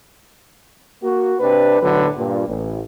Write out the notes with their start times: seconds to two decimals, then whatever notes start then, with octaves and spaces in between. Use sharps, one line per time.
1.03 A#3 F#4
1.40 C3 C4 D4 B4
1.81 B1 A2 D3 F#3 B4
2.17 G2 A#2
2.48 A1